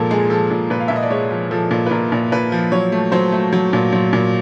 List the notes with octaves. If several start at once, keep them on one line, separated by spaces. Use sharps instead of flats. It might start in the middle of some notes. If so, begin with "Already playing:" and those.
Already playing: A#2 F3 G#3 A4 A#4
G#3 G#4
F3 A4
A#2
A#2 B4
F5
A#2 E5
D#5
D5
G#3 C#5
F3
F3 A4
A#2
B4
A#2 A#4
A#2
A#2 B4
F3
F#3 C#5
A3
F#3 C5
A3
F#3
A#2
F#3
A#2